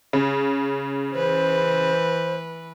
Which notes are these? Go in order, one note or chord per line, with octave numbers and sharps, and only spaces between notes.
C#3
E3 B4 C5